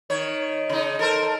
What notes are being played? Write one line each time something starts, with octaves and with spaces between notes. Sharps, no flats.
D#3 C#5
C#3 D#4
A4 A#4 C5